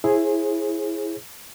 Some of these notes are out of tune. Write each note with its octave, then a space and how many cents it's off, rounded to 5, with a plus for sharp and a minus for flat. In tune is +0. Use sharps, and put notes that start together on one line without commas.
E4 +5 G#4 +0 C5 +35